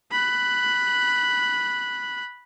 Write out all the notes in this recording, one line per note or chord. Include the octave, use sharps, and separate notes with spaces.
B5 F#6